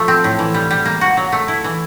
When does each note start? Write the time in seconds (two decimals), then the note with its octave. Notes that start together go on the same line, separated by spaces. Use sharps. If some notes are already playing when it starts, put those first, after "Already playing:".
Already playing: F3 A3
0.08 C4
0.24 A2
0.39 E3
0.54 G3
0.71 G3
0.85 A#3
1.01 F#4
1.17 F#3
1.32 A3
1.48 E4
1.64 E3